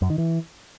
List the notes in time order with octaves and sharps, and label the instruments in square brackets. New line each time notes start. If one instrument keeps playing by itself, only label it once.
[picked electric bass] F#2
D#3
E3